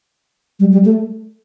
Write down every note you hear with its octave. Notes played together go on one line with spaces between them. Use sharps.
G3
G3
A3